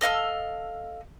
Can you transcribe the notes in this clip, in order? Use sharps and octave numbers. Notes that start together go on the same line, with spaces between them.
A4 D#5 F5 E6